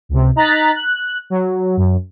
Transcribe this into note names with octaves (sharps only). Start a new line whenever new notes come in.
C#2 C3
D#4 A#5 F#6 A6 B6
F#6
F#3
F#2